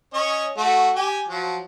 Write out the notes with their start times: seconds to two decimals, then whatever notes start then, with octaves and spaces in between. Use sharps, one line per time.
0.14 C#4 C#5 D#5
0.58 A3 F#4
0.96 G4 G#5
1.28 F3 F#3